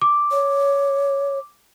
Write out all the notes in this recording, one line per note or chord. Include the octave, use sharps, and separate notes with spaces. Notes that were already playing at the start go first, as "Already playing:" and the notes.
D6
C#5